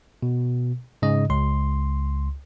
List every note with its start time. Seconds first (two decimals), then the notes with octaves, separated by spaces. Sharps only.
0.23 B2
1.02 G#2 C#3 D#5
1.30 C#2 C6